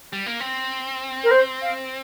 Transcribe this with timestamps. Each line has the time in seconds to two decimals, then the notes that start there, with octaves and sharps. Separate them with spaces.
0.13 G3
0.26 A#3
0.40 C4
1.24 A#4
1.31 C5
1.62 F5